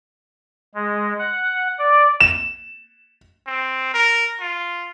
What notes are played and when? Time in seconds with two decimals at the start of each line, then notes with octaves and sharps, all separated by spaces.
0.75 G#3
1.19 F#5
1.79 D5
2.20 E7
3.47 C4
3.94 A#4
4.40 F4